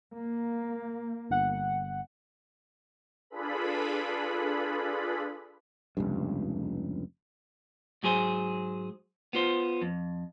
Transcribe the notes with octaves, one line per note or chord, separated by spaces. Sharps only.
A#3
G1 F#5
D4 F4 G#4 A4 B4 B5
F1 C#2 G2
G#2 F#3 G#4 C5 G#5
B3 F4 C5
F2